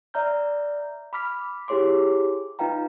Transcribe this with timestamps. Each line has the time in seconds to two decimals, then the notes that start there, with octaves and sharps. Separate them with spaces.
0.14 D5 E5 A#5 F6 G6
1.13 B5 D6 F6 B6
1.68 E4 G4 G#4 C#5 C6 D6
2.59 D#4 F4 B4 F5 G5 A#5